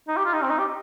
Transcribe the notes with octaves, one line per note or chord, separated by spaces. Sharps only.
D#4
G4
F4
D#4
C4
D#4
G4